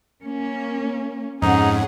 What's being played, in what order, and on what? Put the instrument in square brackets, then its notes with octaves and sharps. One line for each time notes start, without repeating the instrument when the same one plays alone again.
[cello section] A#3 C#4
[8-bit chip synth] F2 G#2 [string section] C#4 G#4 F#5 [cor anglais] D#4